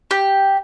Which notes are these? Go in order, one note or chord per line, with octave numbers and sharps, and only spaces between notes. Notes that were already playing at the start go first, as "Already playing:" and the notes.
G4